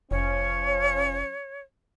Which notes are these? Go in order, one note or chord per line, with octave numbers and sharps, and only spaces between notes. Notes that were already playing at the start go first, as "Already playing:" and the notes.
F1 F3 C#4 C#5